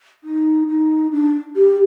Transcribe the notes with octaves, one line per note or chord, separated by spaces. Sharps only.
D#4
D#4
D4
G4